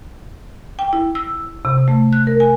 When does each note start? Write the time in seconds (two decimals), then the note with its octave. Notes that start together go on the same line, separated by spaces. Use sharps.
0.79 G5
0.93 E4
1.15 E6
1.65 C3
1.88 A3
2.13 F#6
2.27 A#4
2.40 G#5